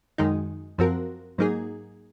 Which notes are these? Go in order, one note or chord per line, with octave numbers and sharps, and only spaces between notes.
F#2 D#3 G#3 D#4
F#2 F3 C4 F#4 A#4
G#2 F#3 A#3 D#4 G#4